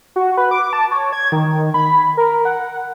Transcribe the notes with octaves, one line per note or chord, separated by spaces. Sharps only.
F#4
B4
D6
A5
C#5
G#6
D#3
B5
A#4
F#5